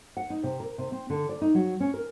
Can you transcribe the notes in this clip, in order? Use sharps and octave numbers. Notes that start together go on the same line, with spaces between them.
F#5
D#4
C3
A#4
C3
C4
D3
D5
D#4
F#3
C#4
A#4